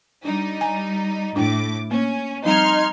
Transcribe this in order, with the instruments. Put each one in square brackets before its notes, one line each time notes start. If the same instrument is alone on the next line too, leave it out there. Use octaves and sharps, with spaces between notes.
[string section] G3 D#4 [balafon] D4
[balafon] G#5
[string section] A2 D6 [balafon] D4 E4 G5
[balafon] A#3 [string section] C#4
[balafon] F3 G3 C4 [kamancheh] D#4 [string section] C6 F6 G#6